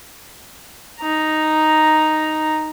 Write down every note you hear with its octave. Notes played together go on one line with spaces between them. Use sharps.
D#4 A#5